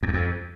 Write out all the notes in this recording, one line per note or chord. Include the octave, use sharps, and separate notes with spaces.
F2
E2
F2